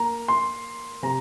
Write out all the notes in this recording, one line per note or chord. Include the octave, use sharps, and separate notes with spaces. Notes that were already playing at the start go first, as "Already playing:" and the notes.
Already playing: A#3 A#5
C6
C3 A#5